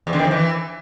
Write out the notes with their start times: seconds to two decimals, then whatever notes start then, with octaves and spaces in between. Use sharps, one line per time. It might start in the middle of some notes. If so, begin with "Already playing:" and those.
0.07 E2
0.13 D3
0.19 D#3
0.25 F2
0.31 E3